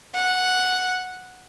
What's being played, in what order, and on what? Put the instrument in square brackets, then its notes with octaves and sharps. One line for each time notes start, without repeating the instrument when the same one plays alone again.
[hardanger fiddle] F#5